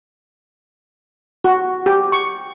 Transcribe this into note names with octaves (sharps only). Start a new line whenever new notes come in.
F#4
G4
C#6